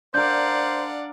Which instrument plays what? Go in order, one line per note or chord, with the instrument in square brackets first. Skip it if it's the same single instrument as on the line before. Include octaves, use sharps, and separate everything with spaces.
[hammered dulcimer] D4 A#4 [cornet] C5 [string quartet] D5 F5 F#5 [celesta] G6